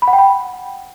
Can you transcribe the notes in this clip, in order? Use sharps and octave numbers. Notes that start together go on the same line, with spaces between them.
B5
F#5
G5
B5